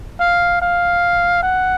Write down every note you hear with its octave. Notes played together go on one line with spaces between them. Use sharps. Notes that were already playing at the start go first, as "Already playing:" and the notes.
F5
F5
F#5